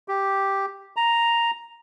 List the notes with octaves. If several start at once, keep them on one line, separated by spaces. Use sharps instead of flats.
G4
A#5